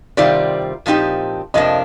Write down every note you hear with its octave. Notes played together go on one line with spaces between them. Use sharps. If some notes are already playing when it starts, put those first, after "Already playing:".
C3 D#3 G3 C4 F4 D5
A#2 F3 C4 D#4 G4
F2 C3 F3 A#3 D4 D#5